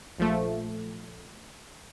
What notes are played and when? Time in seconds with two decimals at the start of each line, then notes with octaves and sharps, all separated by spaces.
0.18 A#1 F3 A3